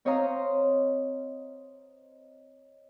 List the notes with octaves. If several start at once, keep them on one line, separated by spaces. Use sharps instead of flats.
C4 C#5 D#5 F5 A#5